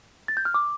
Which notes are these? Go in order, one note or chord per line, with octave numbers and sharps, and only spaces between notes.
A6
G6
F6
D6